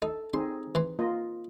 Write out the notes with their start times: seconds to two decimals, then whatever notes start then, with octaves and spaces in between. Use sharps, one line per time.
0.02 D#4 A4
0.34 C4 D#4 G#4 C6
0.75 E3 C6
0.99 A#3 F4 D#5